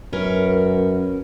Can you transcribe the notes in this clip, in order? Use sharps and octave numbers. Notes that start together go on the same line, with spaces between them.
F#2 C#4 A#4 B4